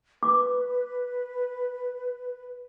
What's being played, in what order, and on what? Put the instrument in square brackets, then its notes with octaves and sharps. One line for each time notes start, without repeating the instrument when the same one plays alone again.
[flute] B4 [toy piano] D6